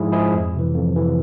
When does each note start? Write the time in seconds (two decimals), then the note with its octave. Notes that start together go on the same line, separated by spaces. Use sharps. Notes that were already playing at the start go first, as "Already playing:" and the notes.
Already playing: G#2 F3 G#3 E4 G#4
0.12 F3 G#3 E4 G#4
0.33 F2
0.54 C3 E3
0.74 F2
0.95 C3 E3